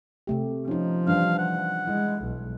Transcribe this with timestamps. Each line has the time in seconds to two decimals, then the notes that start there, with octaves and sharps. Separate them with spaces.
0.27 C3 A3 G4
0.68 F3 C#4 D#4
1.08 E3 G3 D4 F5
1.38 F#5
1.88 G#3 E4
2.24 B1